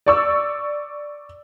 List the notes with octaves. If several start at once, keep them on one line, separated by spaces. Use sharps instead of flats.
D5 C#6 E6